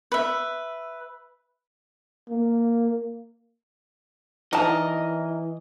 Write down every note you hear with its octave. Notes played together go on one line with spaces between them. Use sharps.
B4 E5
A#3
E3 D#4 A#4 D5 D#5 A5